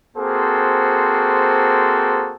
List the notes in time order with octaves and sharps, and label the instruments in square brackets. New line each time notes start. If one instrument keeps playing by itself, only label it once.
[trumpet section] A#3 C4 F#4 G#4 A4 C5